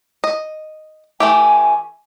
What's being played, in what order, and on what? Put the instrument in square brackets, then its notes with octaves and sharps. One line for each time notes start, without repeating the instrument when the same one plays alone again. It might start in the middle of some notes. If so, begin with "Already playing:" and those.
[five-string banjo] D#5
[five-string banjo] E3 A3 G4 [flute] G#5